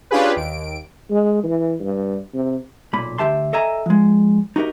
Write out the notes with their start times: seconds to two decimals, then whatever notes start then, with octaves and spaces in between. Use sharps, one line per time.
0.11 C#4 D4 F4 G4 G#4 B4
0.36 D#2 D7
1.11 G#3
1.44 E3
1.80 G2
2.34 C3
2.93 B1 A#2 B5
3.18 D2 G4 E5 A5 C6
3.53 A4 D#5 E5 G#5 A#5
3.86 F3 G#3
4.56 D#4 F#4 G4 A#4 D#5